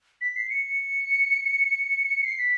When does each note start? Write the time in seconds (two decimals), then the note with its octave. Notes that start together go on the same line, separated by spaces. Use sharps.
0.21 B6
0.36 C7
0.50 C#7
2.24 C7
2.38 B6